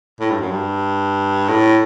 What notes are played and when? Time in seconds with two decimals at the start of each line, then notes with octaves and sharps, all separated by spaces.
0.20 A2
0.30 G2
0.40 F#2
0.51 G2
1.48 A2